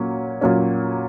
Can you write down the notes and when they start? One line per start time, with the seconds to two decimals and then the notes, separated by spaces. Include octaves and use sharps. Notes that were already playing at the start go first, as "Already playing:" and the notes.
Already playing: A#2 F#3 A#3 C#4
0.41 A#2 F#3 A#3 C#4